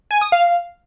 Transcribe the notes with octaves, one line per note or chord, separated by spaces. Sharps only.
G#5
D#6
F5